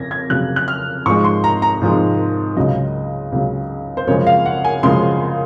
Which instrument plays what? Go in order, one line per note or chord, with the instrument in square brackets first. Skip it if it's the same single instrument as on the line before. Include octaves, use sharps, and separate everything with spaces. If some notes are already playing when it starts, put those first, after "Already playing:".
Already playing: [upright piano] F2 C#3 G#6 A#6
G#6
F2 C#3 F#3 F#6
F#6
F6
G#2 F3 G#3 C#6
C6
A#5
A#5
G#2 F3 G#3
C#2 C#3 F#3 D#5
C#2 C#3 F#3
C5
F#2 C#3 F3 G#3 C#5
F5
F#5
G#5
F#2 C#3 F3 G#3 C6